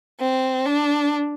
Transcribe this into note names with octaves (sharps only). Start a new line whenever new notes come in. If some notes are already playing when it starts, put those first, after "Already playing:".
C4
D4